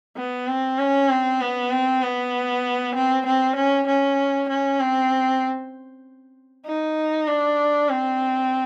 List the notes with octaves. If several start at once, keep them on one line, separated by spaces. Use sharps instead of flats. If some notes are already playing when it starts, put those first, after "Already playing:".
B3
C4
C#4
C4
B3
C4
B3
C4
C4
C#4
C#4
C#4
C4
D#4
D4
C4